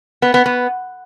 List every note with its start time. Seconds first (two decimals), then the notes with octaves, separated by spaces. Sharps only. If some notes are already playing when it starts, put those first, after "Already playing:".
0.22 B3
0.34 B3
0.46 B3